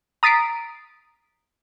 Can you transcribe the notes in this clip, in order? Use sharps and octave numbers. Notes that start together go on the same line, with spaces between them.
A#5 D#6 A6 B6 C7 D7